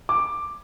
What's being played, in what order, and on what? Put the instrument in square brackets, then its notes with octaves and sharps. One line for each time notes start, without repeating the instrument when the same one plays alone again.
[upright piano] D6